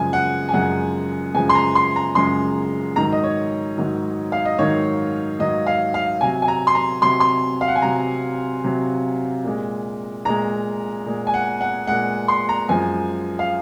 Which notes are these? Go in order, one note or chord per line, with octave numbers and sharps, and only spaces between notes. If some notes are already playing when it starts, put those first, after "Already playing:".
Already playing: F#2 C#3 F3 G#3 G#5
F#5
G#5
F#2 C#3 F3 G#3 F#5
F#2 C#3 F3 G#3 G#5
C6
A#5
C6
A#5
F#2 C#3 F3 G#3 C6
G#2 D#3 F#3 A#5
D#5
C#5
G#2 D#3 F#3
F5
D#5
G#2 D#3 F#3 C#5
G#2 D#3 F#3 D#5
F5
F5
C3 F#3 G#5
G#5
A#5
C6
A#5
C3 F#3 C6
C6
F5
F#5
G#5
C3 F#3 A#5
C3 F#3
A#2 G#3
A#2 G#3 A#5
A#2 G#3
G#5
F#5
F#5
A#2 G#3 F#5
C6
A#5
F#2 F3 G#3 G#5
F5